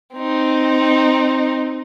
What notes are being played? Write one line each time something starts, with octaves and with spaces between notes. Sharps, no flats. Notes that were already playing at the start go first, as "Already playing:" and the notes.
C4 D#4